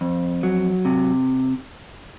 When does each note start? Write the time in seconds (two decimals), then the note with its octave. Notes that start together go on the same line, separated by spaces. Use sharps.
0.01 F2
0.43 F#3
0.85 C3